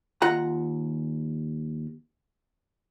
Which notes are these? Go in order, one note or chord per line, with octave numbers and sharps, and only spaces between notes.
D#2 F4 F#5 A#5